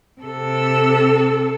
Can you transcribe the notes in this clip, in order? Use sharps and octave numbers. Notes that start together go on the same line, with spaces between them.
C3 A4